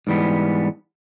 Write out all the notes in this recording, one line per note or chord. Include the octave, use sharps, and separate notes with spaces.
G#2 E3 G3 B3